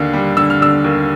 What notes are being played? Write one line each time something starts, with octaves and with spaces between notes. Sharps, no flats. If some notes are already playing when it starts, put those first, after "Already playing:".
Already playing: D#2 D3
G3
D3 E6
F6
D3 E6
D#2